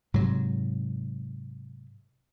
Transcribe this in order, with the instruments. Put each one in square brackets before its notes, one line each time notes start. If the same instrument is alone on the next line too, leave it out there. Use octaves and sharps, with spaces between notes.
[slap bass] G#2 C3 F#3